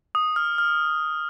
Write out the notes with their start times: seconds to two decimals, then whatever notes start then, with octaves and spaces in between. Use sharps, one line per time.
0.15 D#6
0.36 F6
0.58 F6